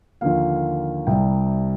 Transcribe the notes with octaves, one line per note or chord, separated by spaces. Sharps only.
D#2 D3 F3 A#3 F5
C2 C3 G3 G5